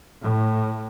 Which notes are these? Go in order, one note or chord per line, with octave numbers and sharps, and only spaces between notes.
A2